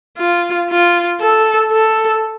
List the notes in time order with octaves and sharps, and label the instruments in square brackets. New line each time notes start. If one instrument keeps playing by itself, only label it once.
[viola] F4
F4
A4
A4